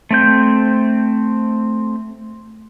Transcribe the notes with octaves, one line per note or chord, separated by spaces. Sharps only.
A3 C4 G6